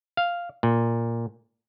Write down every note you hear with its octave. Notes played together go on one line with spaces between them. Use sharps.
F5
A#2